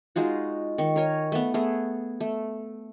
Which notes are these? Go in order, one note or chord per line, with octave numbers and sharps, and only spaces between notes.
G#3 D#4 F4 F#4
D#3 C#6
A#4 C#5 G#5
A3 B3
A3 B3 G#4
A3